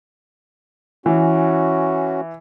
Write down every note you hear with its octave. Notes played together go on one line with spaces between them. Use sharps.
E3 C#4 F#4